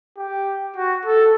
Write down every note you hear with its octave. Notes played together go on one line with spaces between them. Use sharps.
G4
F#4
A4